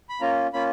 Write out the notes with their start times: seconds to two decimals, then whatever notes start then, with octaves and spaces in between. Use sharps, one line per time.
0.09 B5
0.21 A#3 C#4 F4 A#5
0.53 A#3 C#4 F4 B5